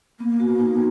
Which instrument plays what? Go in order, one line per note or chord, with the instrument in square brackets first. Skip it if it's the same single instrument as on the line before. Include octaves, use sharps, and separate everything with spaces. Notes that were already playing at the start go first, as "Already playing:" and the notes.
[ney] A#3 [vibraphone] B3
[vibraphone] F#4
D#4